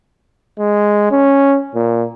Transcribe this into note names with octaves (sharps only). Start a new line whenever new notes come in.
G#3
C#4
A#2